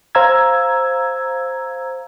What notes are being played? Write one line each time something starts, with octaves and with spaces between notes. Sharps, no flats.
C5 F5 A#5 E6 G#6